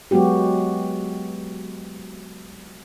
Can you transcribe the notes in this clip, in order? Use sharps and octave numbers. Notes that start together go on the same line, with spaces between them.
F#3 G#3 B3 F#4 G4